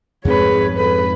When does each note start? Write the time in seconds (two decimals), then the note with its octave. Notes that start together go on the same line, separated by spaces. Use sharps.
0.25 F2 G#2 C4 G#4 B4 C#5
0.77 A4 B4